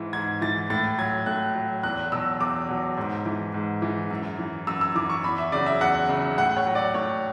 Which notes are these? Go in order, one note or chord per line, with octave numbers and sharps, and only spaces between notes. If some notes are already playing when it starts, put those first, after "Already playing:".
Already playing: G#2 E3
G#2 G#6
E3 A6
A2 A6
F#3 G#6
A2 F#6
F#3
E2 F#6
B2 F#3 E6
E2 D6
B2 F#3
G#2
E3
G#2
E3
F#2
E3
F#2 E6
E6
E3 D6
C#6
E2 B5
E5
C#3 F#3 D5
E5
E2 F#5
C#3 F#3
A2 F#5
C#5
F#3
D5
A2 C#5